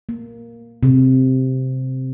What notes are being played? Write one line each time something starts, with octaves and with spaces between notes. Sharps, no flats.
A#3
C3